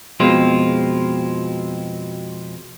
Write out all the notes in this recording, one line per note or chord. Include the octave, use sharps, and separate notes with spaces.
F2 B2 G#3 C4 F4